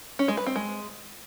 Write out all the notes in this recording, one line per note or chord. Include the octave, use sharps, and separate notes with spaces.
C#4
G#3
B4
C4
G#3